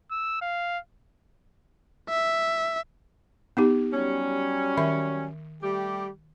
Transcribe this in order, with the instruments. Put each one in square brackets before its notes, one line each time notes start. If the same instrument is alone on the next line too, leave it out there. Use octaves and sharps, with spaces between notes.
[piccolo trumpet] E6
F5
[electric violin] E5
[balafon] B3 D#4 G4
[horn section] F#3 G3 C#4
[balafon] D#3 E5 C#6
[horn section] G3 A3 G4